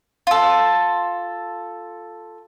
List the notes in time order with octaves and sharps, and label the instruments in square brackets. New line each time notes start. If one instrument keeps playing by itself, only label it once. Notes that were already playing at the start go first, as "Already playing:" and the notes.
[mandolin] F4 A4